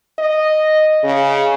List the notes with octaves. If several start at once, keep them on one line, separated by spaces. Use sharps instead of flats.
D#5
C#3